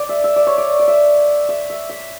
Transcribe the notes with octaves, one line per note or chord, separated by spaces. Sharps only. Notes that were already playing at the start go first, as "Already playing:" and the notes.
Already playing: D5
E5
E5
D5
C#5
D5
D5
E5
E5
E5
E5